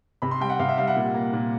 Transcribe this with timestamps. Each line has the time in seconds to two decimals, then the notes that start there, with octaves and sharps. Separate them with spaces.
0.22 C3 B5
0.31 C6
0.40 G3 G5
0.49 F#5
0.59 C3 F5
0.69 E5
0.78 G3 F5
0.87 F#5
0.96 A#2
1.14 A#3
1.33 A#2